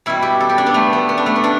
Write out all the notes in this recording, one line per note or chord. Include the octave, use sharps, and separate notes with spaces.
B2 G3 E4
G4
A4
G4
D4
B3
A3
B3
B3
D4
A3
B3
B2 D4